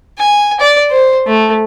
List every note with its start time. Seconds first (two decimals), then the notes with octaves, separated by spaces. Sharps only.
0.19 G#5
0.60 D5
0.91 C5
1.27 A3